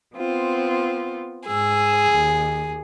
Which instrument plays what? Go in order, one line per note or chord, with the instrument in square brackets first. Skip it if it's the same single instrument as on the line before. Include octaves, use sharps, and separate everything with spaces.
[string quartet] B3 C4 F4
[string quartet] G#2 E6 [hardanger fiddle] G#4
[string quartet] D#2